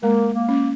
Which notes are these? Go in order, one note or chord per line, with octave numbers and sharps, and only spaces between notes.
G#3 A#3
A#3
C#4